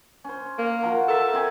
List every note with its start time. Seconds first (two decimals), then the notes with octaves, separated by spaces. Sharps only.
0.24 C#4 C5
0.58 A#3
0.82 F3 F#4 A#4
1.08 G4 A4 A#4 E5
1.33 C4 G4 G#5